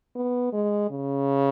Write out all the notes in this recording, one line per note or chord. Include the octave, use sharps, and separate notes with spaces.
B3
G#3
C#3